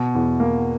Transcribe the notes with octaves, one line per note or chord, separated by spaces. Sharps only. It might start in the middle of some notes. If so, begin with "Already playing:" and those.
Already playing: B2
E2
A#3